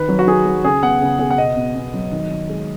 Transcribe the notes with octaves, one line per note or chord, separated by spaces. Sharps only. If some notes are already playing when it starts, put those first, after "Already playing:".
Already playing: D#3 B4
F#3
F#4
D#3 G#4
F#3
C#3 G#4
B3 F#5
C#3
B3 G#4
F#5
B2 D#5
B2
B3
F#3
D#3
D#3
G#3